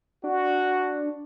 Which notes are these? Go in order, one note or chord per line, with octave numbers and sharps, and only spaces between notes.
D4 F#4